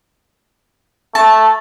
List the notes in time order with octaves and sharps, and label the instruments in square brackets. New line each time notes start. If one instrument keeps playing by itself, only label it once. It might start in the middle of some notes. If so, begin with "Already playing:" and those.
[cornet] A3 [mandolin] A5